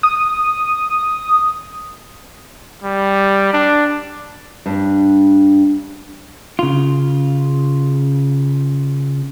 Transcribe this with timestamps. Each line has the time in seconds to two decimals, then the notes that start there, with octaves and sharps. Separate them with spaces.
0.03 D#6
2.83 G3
3.53 D4
4.66 G2 D4
6.59 C#3 F4